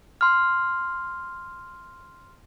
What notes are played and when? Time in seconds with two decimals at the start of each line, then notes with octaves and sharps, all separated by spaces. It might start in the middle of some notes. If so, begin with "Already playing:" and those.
0.21 C6 F6